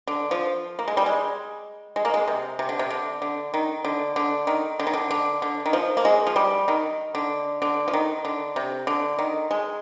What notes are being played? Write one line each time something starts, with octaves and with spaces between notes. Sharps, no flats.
D3
F3
A#3
G#3
G3
G#3
G#3
A#3
G#3
C3
C3
D3
C3
D3
D3
D#3
D3
D3
D#3
D3
D#3
D3
D3
D3
D#3
F3
A#3
G#3
F3
G3
D#3
D3
D3
F3
D#3
D3
C3
D3
D#3
G#3